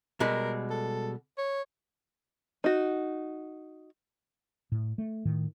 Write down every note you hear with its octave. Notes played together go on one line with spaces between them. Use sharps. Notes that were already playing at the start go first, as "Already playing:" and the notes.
B2 G3 G#3 A#4
A4
C#5
D#4 F#4
A2
A3
A2 D#3